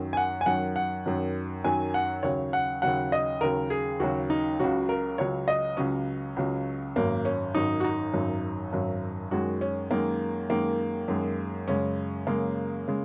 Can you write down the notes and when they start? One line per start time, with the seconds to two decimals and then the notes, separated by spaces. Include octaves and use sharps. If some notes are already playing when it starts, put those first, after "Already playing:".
Already playing: F#2 D#3 F#3
0.13 G#5
0.17 F#5
0.41 G#5
0.46 F#2 D#3 F#3 F#5
0.76 F#5
1.06 F#2 D#3 F#3
1.64 F#2 D#3 F#3 G#5
1.94 F#5
2.23 D#2 C#3 F#3 C#5
2.53 F#5
2.82 D#2 C#3 F#3 F#5
3.12 D#5
3.41 D#2 C#3 F#3 A#4
3.70 G#4
4.00 D#2 C#3 F#3 F#4
4.30 D#4
4.60 C#2 C#3 F#3 F#4
4.89 A#4
5.18 C#2 C#3 F#3 C#5
5.48 D#5
5.77 C#2 C#3 F#3 C#4
6.36 C#2 C#3 F#3
6.96 G#1 F#2 F#3 A#3
7.25 C#4
7.55 G#1 F#2 F#3 D#4
7.80 F#4
7.84 D#4
8.14 G#1 F#2 F#3
8.72 G#1 F#2 F#3
9.31 F#2 D#3 G#3 F#4
9.61 C#4
9.91 F#2 D#3 G#3 A#3
10.50 F#2 D#3 G#3 A#3
11.08 F#2 D#3 G#3
11.68 F#2 C#3 G#3 C#4
12.27 F#2 C#3 G#3 A#3
12.88 C#3 G#3